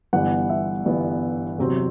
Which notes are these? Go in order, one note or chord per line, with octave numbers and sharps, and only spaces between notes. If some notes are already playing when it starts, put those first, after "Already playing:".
G1 G2 E3 B3 F#5
E5
G1 G2 E3 B3
E2 C3 F#3 C4